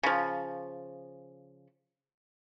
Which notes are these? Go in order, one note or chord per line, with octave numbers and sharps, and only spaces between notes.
C#3 F3